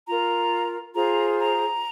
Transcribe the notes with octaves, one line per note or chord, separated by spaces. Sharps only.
F4 A#4 A#5
F4 G#4 C5 A#5
A#5